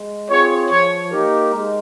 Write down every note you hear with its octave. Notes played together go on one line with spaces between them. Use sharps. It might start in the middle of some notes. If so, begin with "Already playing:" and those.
Already playing: G#3
C4 F4 G#4 C#5
F3 C#5
A#3 D#4 G4 A#4
G#3